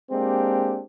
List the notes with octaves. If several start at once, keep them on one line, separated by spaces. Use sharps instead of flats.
G#3 A#3 C4 D4 G4